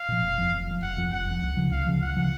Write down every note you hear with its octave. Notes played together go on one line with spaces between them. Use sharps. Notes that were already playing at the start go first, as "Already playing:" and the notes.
Already playing: F5
A#2 F3
F1
F2 F3
F1
F2 F3
F1 F#5
F2 F3
F1 F#5
F2 F3
C#2
C#3 F3
C#2 F5
C#3 F3
C#2 F#5
C#3 F3